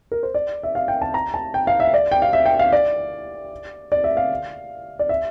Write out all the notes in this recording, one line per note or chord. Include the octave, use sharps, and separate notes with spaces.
A#4
C5
D5
E5
F5
G5
A5
A#5
A5
G5
F5
E5
D5
G5
F5
E5
G5
F5
D5
D5
E5
F5
D5
E5